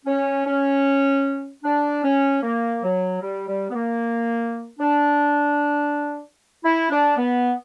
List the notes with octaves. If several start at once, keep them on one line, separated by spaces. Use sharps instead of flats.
C#4
C#4
D4
C#4
A#3
F#3
G3
G3
B3
A#3
D4
E4
D4
B3